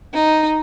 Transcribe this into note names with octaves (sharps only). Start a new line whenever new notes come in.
D#4